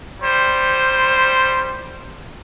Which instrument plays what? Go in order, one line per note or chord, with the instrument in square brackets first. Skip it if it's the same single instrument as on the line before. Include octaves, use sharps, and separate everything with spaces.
[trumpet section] G3 C5